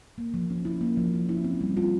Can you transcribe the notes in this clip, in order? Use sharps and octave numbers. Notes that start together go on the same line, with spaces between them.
A#3
F3
C#4
E4
A#3
F3
C#4
E4
C4
G3
F4